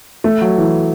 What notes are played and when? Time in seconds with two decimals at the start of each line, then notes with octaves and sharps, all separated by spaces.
0.24 A3
0.41 F#3
0.58 E3